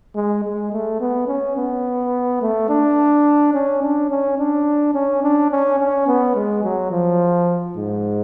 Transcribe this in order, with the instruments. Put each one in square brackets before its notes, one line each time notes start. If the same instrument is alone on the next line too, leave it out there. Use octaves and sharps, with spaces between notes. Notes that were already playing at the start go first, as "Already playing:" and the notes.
[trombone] G#3
G#3
A3
B3
C#4
B3
A3
D4
C#4
D4
C#4
D4
C#4
D4
C#4
C#4
B3
G#3
F#3
F3
G#2